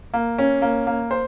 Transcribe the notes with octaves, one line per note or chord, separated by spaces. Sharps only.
A#3
C#4
A#3
A#3
C5